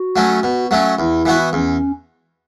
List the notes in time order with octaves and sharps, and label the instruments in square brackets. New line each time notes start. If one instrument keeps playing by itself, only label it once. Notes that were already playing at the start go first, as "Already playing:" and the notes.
Already playing: [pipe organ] F#4
[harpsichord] F#3 A3 C#4
B2
F#3 A3 C#4
[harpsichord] E2 [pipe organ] E4
[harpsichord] E3 B3 F#4
[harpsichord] E2 [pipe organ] C#4